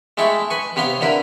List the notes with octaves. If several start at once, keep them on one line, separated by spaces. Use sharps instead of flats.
G#3 A3 E4 G5 C#6
B4 G#5 C#6
C3 B3 C#5 F5 C6
D3 E4 A#4 B4